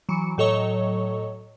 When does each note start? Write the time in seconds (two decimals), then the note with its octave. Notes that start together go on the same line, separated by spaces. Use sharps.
0.09 E3 F#3 C#7
0.38 A2 F#3 A4 C#5 D#5 C#6